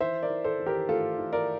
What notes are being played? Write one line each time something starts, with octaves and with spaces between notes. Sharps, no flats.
E3 C5 E5
A#4 D5
E3
A4 C5
E3
G4 A#4
A3 F4 A4
E3
A#4 D5